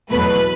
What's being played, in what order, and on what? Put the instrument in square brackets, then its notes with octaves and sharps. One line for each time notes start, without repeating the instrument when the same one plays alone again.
[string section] E2 B2 F#3 A3 B4